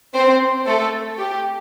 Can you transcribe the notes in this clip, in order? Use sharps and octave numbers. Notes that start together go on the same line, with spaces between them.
C4 C5
A3 A4
G4